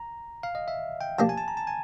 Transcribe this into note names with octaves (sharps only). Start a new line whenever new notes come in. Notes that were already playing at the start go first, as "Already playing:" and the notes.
Already playing: A#5
F5
D#5
E5
G5
F3 A#3 D4 G4 A5
G#5
A5
A#5
A5
G#5